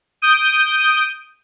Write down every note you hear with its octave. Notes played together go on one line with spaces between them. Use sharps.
D#6 G6 D7 D#7